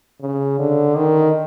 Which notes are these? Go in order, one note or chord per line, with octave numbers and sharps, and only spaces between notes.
C#3
D3
D#3